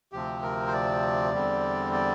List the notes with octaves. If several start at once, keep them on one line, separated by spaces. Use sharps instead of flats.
D2 C3 F3 C4 G4
A#4
C5
D5
E2 D3 G3 C4
D5